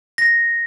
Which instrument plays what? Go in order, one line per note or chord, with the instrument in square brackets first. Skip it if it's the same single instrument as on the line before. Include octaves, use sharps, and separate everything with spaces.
[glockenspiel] A#6